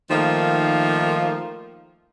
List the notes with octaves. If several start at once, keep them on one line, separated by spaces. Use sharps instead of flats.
D#3 F3 A3 A#3 D#4 F4